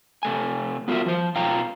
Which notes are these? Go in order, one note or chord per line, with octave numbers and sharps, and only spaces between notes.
C3 A3 G#5
B3 F4 F#4 A#4 E5
F3 C5
B2 F4 F5 G5 A#5